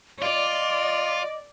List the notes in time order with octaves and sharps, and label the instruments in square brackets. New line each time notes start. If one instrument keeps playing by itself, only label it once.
[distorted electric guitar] F4 [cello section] D5 [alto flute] D#5